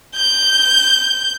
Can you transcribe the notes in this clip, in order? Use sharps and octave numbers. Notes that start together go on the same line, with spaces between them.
G6